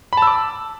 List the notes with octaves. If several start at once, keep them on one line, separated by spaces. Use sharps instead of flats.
A5 B5 D6 E6